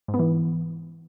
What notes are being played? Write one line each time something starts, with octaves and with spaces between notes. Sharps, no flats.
G#2
B3
E3